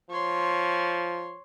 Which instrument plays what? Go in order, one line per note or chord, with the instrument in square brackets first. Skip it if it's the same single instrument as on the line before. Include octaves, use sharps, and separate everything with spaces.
[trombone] F3 [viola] C#5 C6